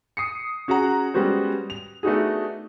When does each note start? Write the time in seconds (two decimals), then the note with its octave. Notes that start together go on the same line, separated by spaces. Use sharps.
0.17 D#6 C7 C#7
0.68 C#4 F#4 G#4 F#5 A#5
1.14 G3 G#3 B3 C#4 F#4 C5
1.70 F7
2.03 A3 B3 D4 D#4 F#4 G#4